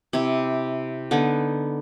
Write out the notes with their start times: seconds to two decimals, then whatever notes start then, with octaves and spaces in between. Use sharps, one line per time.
0.13 C3 E4
1.11 D3 B3 D#4